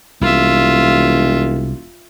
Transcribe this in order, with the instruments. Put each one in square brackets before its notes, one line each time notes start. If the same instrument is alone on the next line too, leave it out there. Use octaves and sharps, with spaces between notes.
[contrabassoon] E1 [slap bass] C2 [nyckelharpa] F4 E5